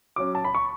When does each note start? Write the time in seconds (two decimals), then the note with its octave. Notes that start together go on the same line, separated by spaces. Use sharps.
0.16 F#3 C#4 D6
0.35 A5
0.44 B5
0.55 C#6